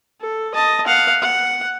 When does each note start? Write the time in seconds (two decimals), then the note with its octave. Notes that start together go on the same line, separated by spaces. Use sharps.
0.21 A4
0.55 D#5 A5
0.87 F5 F#5
1.22 F#5